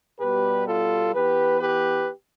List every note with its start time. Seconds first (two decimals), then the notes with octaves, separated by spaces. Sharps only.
0.19 B2 G3 B3 G4 B4
0.66 F4 A4
1.13 E3 B3 G4 B4
1.60 G4 B4